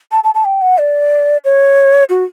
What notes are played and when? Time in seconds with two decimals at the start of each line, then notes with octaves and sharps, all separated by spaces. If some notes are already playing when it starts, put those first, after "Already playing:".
0.12 A5
0.24 A5
0.35 A5
0.45 G5
0.61 F#5
0.78 D5
1.45 C#5
2.09 F#4